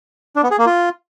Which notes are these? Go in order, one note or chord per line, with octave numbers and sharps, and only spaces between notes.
D4
B3
G#4
A#3
F4